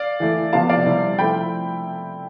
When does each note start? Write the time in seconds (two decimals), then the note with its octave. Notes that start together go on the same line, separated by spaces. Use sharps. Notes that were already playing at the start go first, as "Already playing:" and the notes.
Already playing: D5 F5
0.20 E3 A3 E4
0.53 C3 F3 B3 F4 F5 A5
0.69 D5 F5
0.86 C3 G3 C4 E4
1.19 F3 A3 C4 E4 G5 B5